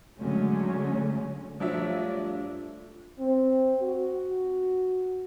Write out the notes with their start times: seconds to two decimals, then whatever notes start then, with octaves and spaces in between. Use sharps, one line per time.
0.20 D3 F#3 G#3 A3 C#4
1.60 G2 F3 F#3 A3 D4 F4 E5
3.19 C4
3.82 F#4